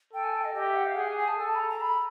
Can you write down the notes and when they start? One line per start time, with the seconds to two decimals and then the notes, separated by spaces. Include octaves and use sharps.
0.13 A4 G5
0.24 G#5
0.35 G5
0.44 D#5
0.55 G4 D#5
0.66 E5
0.76 F#5
0.87 F5
0.96 G#4 F#5
1.07 G#5
1.18 G#5
1.28 A5
1.38 A4 G#5
1.49 A5
1.55 B5
1.59 A#5
1.69 A#5
1.81 B5